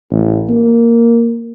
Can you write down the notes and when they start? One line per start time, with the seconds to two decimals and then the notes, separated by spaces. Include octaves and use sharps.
0.11 A1
0.50 A#3